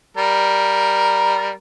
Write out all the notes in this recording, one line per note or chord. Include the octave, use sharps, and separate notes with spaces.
G3 A#4